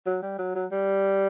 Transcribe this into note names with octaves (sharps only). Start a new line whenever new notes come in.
F#3
G3
F#3
F#3
G3